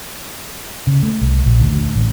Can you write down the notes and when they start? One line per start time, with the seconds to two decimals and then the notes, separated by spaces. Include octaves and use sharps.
0.87 C#3
1.03 A3
1.21 C2
1.46 A#1
1.60 D2
1.71 D2
1.95 A1